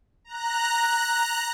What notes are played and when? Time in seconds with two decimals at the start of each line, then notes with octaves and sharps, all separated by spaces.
0.24 A#5 F#6